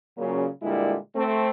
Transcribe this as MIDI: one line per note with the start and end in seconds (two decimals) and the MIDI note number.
0.17 0.46 46
0.17 0.46 49
0.17 0.46 54
0.62 0.96 46
0.62 0.96 50
0.62 0.96 55
0.62 0.96 56
0.62 0.96 58
0.62 0.96 64
1.15 1.50 57
1.15 1.50 60